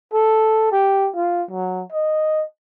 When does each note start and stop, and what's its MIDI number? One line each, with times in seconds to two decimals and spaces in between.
0.13 0.71 69
0.72 1.09 67
1.16 1.43 65
1.51 1.83 54
1.92 2.44 75